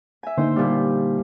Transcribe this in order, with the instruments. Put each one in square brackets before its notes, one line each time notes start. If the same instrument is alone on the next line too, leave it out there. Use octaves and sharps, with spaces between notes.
[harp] E5 G#5
[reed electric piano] D3 A#3 D#4 [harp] C5 G5
[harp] A#2 F3 G3